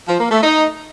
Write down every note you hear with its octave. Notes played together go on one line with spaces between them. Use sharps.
F3
A#3
A3
D#4